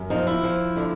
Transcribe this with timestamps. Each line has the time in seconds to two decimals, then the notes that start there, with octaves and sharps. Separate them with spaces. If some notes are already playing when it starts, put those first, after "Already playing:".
Already playing: F#2
0.10 F3 D#4
0.27 E4
0.43 F3
0.76 D3